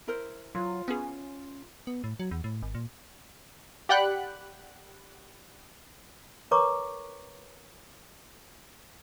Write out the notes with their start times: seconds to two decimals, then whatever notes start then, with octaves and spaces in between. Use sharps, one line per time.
0.07 E4 A#4 C5
0.55 F#3 F4
0.88 B3 C#4 G#4
1.87 B3
2.04 A2
2.20 F#3
2.31 E2
2.44 A2
2.63 G#1
2.75 A#2
3.89 G4 D5 F#5 G5 B5 F#6
6.51 A#4 B4 C#5 A#5 C#6 D6